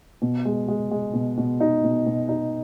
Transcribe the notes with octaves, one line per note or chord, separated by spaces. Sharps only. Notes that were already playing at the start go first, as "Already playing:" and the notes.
B2
G#3
G#3
G#3
B2
B2
D#4
B2
B2
D#4